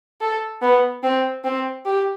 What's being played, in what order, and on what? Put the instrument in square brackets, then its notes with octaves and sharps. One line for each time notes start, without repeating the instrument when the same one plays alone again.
[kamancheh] A4
B3
C4
C4
G4